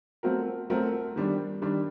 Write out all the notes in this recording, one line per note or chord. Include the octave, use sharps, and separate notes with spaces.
F#3 A3 C4 F#4 A#4
F#3 A3 C4 F#4 A#4
D#3 G3 D4
D#3 G3 D4